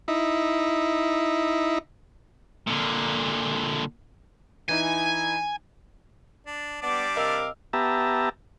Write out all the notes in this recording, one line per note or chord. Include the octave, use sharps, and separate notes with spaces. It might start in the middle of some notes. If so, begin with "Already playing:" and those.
D#4 E4
A#2 D3
E3 D#4 E4 G#5
D4
G3 B3 D4 D5 D6
C3 A#4 D#5 F5 E6
B3 G4 E5 A5 A#5